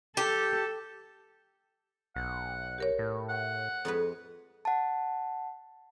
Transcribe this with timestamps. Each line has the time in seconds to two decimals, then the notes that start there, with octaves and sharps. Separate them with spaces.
0.17 G4 A4
2.16 B1 F#5
2.78 G4 A#4 C#5
2.99 A2
3.29 F#5
3.85 F2 G#3 B4
4.65 F#5 A5